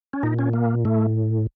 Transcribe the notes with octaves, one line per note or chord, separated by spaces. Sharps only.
C#4
A#2 D#4
C#4
A#3
A2 A3